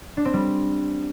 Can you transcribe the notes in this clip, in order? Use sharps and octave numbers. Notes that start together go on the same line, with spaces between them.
D4
C4
G3